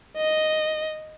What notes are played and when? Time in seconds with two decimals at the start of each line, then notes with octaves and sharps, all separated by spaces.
0.17 D#5